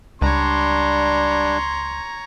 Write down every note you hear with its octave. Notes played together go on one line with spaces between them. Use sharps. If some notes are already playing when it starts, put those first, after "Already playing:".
C#2 G3 D4 C#5 A#5 C6